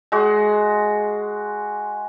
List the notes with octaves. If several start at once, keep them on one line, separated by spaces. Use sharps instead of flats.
G#3 F#4